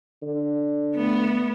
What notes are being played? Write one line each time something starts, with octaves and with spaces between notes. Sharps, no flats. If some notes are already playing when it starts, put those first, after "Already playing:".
D3
A3 B3